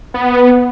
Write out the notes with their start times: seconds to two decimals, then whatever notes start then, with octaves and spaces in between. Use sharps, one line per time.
0.14 B3